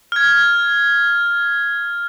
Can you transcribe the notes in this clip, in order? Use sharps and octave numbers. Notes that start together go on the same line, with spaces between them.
F6 G#6